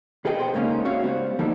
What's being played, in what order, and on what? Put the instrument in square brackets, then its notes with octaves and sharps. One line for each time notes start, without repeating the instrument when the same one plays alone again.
[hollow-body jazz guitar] B2 G#4 A4 B4 D#5 G5
B3 C5
G#2 C#3 A#3 B3 C#4 D#4
C4 F#4 C#5 E5 F5
C#2 G3 B3 C5
D3 F3 G3 A#3 D#4 A4